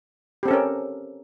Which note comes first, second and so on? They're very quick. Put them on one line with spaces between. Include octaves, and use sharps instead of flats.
G4 C4 A4 C#4 A#4